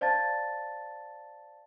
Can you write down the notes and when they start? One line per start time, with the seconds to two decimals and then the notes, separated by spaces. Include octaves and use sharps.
0.01 C5 D5 F5 A5 A6